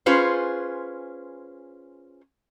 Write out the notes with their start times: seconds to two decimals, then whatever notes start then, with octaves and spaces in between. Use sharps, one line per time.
0.06 C#4 F4 G#4 B4 C5